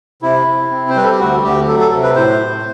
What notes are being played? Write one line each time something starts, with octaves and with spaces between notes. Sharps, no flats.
C3 E4
C3
C4
C5
G3 B4
A4
G4
D2 F#4
D2 G4
F#3 A4
A4
C3 A4
B4
A2 C5
A2